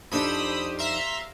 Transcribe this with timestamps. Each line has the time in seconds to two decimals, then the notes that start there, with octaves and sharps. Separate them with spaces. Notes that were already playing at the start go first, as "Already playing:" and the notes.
0.12 F2 D4 D#4 G4 C5 B5 D#6 E6
0.79 E5 F5 A#5 C6